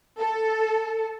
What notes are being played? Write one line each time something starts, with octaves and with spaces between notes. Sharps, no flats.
A4